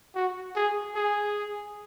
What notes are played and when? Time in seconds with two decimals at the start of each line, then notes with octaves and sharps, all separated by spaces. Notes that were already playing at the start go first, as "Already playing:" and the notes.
0.15 F#4
0.56 G#4
0.95 G#4